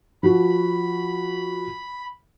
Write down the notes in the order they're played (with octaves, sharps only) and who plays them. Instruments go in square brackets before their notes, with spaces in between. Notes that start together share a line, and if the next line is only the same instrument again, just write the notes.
[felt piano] F3 F#4 [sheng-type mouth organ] B5